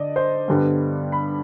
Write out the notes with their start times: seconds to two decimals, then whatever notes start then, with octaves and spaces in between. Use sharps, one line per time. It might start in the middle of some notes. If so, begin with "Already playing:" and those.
Already playing: D3 D5 D#5
0.16 C5
0.48 G2 D3 G3 B3
1.12 B5